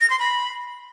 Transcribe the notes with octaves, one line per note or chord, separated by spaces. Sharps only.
A#6
C6
B5